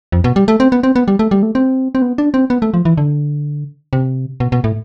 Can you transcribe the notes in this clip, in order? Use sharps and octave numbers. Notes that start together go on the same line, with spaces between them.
F2
B2
G3
A3
C4
B3
C4
B3
G3
A3
G3
A3
C4
C4
B3
D4
C4
B3
A3
F3
E3
D3
C3
B2
B2
A2